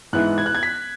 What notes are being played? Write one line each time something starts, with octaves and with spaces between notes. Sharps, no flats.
G#2 E3 B3 E4 F#6
G#6
F#6
G#6
B6